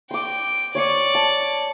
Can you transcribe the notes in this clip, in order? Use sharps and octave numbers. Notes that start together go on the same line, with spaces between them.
G5 C6 D6 D7
C#5 D5 D6 D#6 C#7
A5